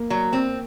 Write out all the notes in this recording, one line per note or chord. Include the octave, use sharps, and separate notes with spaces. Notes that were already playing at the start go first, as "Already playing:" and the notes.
Already playing: A#3
F#3
C4